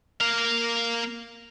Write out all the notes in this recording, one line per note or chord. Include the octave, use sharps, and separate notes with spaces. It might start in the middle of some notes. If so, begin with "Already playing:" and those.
A#3 F5